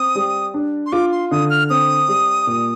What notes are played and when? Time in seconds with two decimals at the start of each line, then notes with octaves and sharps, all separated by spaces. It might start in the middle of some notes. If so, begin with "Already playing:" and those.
Already playing: C4 D#6
0.15 G3
0.54 D4
0.86 C6
0.92 F4 D6
1.12 C6
1.31 D3 D#6
1.50 F6
1.70 C4 D#6
2.08 G3
2.47 A#2